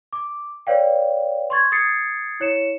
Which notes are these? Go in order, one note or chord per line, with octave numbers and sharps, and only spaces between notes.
D6
B4 C#5 D5 F5 G5
C6 C#6 G#6 A6
D#6 G#6 A6 C7 C#7
E4 C#5 C#7 E7